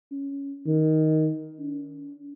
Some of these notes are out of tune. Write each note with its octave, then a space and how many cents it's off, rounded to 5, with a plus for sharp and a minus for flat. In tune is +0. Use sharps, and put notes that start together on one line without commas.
C#4 +5
D#3 +10
C#4 +45